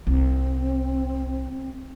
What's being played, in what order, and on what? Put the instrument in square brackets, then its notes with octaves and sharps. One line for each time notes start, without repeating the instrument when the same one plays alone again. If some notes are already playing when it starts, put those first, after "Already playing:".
[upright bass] C2 [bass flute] C4